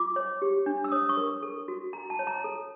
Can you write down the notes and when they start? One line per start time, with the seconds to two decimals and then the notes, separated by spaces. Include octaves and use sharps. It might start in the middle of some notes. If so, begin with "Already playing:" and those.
Already playing: F4 D6
0.16 C#5
0.42 G4
0.66 D4
0.84 E6
0.92 C#5 D#6
1.09 C#6
1.17 A#4
1.43 A4
1.68 F#4
1.93 F#4 A#5
2.10 A5
2.19 C#5
2.27 A#5
2.44 A4